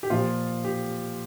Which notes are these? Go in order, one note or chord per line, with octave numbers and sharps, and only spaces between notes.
G4
A#2 F3 F4
G4